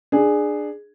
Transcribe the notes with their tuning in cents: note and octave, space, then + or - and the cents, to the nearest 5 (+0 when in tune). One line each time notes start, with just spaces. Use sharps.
D4 +20 G#4 +0